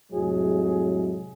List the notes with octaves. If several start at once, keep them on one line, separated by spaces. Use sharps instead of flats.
F2 A2 C3 F#3 G#3 G#4